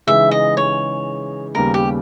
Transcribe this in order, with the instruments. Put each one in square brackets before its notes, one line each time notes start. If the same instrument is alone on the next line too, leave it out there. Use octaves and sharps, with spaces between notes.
[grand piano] C#3 E3 G#3 D#4 [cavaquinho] E5
[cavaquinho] D#5
C#5
[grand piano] D#2 C#3 G3 B3 [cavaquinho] A#4
[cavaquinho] G4